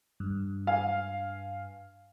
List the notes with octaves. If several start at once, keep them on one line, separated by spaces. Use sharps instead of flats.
G2
F5 G#5